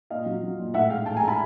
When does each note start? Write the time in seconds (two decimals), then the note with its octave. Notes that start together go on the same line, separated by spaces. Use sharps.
0.10 A#2 D#5 F5
0.26 F#3
0.43 F#3
0.58 A#2
0.74 A2 E5 F#5
0.90 G#3 F5 G5
1.05 A2 G5 A5
1.17 G#5 A#5
1.22 G#3
1.28 A5 B5